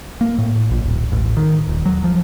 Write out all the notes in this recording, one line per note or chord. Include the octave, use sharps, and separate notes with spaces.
A#3
A2
A#1
D#1
A1
D#3
D#1
F#3
F3